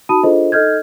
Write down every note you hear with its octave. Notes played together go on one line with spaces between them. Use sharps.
D#4 F#4 A5 B5 D#6 D#7
D4 F4 G#4 A4 C5 D#5
D#4 A4 D#5 F6 G6 G#6